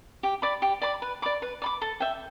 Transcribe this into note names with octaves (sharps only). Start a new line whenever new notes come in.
G4
D5 B5 D6
G4
D5 B5 D6
B4
D5 B5 D6
B4
D5 B5 D6
A4
E5 G5